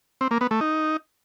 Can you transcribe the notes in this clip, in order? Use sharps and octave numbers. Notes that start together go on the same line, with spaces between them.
C4
A#3
B3
A3
D#4